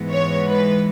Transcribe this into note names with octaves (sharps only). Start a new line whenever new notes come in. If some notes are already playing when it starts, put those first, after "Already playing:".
Already playing: G#2 E3 G#3 B3
C#5
B4